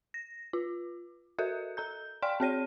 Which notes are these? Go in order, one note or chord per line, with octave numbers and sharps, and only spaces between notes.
A#6
F4
F#4 A4 A#4 E5
A4 A#5 G6
D5 F5 G5 C6 F6
C4 G#4 C#5 D#7